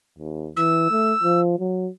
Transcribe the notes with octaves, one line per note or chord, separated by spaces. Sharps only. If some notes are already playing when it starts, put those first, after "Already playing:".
D#2
E3 E6
A3
F3
F#3